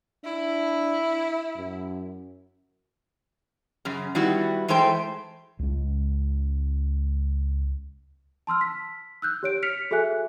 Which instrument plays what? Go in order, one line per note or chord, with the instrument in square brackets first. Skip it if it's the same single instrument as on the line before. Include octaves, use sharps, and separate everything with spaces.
[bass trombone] D4 [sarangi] E4
[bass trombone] F#2
[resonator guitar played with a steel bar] F#2 C#3
D#3 G3 B3 E4 F#4
E3 G#3 A3 C5 G5
[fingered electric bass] C#2 G#3
[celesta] A5 C6 E6 F6
B6
E6 F#6 G6
G4 C#5 D7
F6 B6 C#7 F7
F#4 G#4 A4 E5 G#5 F#6